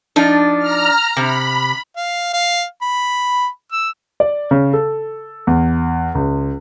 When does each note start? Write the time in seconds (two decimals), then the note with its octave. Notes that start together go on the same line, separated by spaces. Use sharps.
0.16 F3 D4 D#4
0.59 A#5 F6
1.17 C3 B5
1.96 F5
2.33 F5
2.82 B5
3.72 E6
4.20 D5
4.51 C#3
4.73 A4
5.47 E2
6.15 C#2